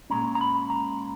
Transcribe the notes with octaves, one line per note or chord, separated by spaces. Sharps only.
A#2 G#3 C#4 A#5
A#5
B5
A#5